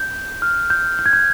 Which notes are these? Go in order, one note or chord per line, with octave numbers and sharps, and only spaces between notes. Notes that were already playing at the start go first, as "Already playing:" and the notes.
Already playing: G6
F6
G6
G6
G#6
G6